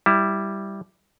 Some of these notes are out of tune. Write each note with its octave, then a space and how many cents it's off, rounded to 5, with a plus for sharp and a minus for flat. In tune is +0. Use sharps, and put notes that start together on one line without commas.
G3 +0 E4 +0